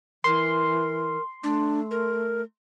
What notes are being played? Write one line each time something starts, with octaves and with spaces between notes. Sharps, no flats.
E3 A#4 C6
A3 D4
A#4